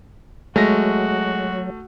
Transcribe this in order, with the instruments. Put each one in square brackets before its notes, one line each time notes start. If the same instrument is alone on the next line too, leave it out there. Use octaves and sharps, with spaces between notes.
[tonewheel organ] F#3 [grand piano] G#3 [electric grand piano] A3 A#6 [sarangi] F#4